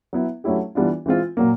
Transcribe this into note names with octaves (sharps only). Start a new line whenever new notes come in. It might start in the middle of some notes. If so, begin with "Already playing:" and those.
F#3 B3 E4
F#3 A3 C#4 E4 G4
E3 G3 B3 D4 F4
E3 G#3 C4 F4
A#2 F#3 A#3